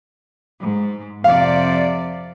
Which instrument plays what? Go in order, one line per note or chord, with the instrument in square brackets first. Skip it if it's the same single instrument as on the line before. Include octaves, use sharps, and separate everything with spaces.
[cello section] G#2
[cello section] F2 C3 D5 [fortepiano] F5